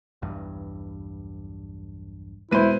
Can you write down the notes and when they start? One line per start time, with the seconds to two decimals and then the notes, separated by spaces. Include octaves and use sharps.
0.22 B1 E2 G2
2.51 E1 E4 B4 C5 D#7